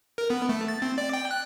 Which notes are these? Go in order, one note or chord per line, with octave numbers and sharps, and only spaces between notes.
A#4
B3
A3
A6
C4
D5
G5
F#6